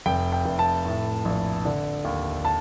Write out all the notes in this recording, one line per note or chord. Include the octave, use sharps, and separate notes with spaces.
F1 G5
G5
F1
A5
A2
A#1
D3
D#2
A5